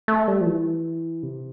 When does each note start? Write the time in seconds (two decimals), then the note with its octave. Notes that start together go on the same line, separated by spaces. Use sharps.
0.08 A3
0.28 G3
0.41 F3
0.46 E3
1.23 C3